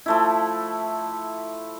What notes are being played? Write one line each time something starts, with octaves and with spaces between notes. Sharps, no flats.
F3 A3 E4